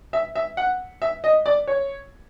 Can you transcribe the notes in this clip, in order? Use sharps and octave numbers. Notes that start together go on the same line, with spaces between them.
E5
E5
F#5
E5
D#5
D5
C#5